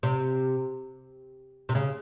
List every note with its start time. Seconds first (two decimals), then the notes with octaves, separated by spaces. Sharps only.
0.03 C3
1.69 C3
1.75 C#3